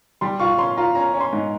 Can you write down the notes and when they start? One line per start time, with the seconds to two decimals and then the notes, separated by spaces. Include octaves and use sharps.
0.21 G3 C6
0.40 F4 C#6
0.58 C#4 C6
0.77 F4 A#5
0.95 C#4 A#5
1.14 C#4
1.21 C6
1.33 G#2